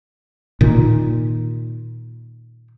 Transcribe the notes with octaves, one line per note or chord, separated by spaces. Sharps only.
A#2 D#3